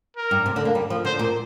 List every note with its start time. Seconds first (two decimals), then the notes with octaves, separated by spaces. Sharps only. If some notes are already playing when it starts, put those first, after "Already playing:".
0.16 A#4
0.31 G2
0.46 C3
0.56 D3
0.65 A#3
0.75 G3
0.90 F3
1.05 D3 C5
1.19 A#2